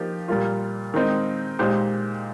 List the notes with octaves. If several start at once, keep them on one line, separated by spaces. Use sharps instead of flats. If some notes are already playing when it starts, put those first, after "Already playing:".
Already playing: F3 A#3 D#4 G4
A#2 G3 A#3 F4
D#3 G#3 C4 D#4
A#2 G#3 D#4 G4 C5